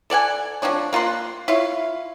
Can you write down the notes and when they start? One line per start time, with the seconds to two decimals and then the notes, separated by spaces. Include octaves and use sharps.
0.10 A4 D5 F#5 G#5
0.62 F3 C4 D4 C#5
0.93 A#3 F4 F#5 C6
1.48 E4 F4 C#5 F5